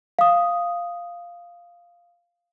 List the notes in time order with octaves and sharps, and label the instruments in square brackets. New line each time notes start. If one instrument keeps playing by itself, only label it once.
[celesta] F5 D#6